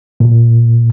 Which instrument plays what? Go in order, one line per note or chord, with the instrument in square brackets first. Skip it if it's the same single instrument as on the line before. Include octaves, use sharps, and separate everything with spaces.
[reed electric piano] A#2